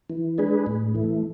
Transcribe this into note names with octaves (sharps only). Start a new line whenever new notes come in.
E3
G#3 D4 G#4 B4
A2
E3 A3